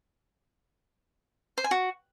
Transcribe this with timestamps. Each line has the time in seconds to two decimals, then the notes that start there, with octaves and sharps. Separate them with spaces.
1.58 C5
1.64 G#5
1.71 F#4